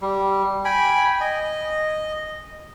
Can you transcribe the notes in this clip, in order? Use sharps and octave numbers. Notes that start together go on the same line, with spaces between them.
G3
G5 G#5 B5
D#5